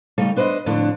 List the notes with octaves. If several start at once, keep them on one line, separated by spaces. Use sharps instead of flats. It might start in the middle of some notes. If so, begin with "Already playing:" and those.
C#3 G3 A3 D#4
D4 B4 C5 D5 D#5
F2 A2 D3 D4